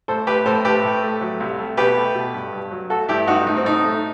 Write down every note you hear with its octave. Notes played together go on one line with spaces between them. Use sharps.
A2 A4 C5
A3 G4 B4
A2 A4 C5
A2 G4 B4
A2
A3
F#3
C2
A3
B2 G4 B4
A3
B2
G2
G2
F#3
A3 F#4 A4
G2 E4 G4
G2 D#4 F#4
A2 D#4
C4
A2 D#4
A3